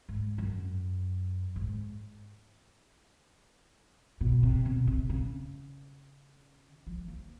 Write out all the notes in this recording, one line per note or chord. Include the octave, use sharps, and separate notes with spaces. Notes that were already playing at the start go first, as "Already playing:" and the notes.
G#2
F#2
G#2
B2
C3
B2
C3
C#3
F3
A#3